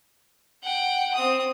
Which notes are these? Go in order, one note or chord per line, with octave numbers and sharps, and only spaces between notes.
F#5 G5
C4 D#6